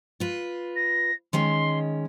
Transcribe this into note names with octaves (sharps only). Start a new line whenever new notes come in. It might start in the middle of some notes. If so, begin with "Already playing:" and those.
F4 B4
A#6
D#3 G#3 C#4 C6